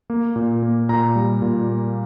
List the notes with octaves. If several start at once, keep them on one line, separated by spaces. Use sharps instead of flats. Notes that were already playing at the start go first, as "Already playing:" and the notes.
A#3
A#2
A#3
A#2 A#5
G3
A#2
A#3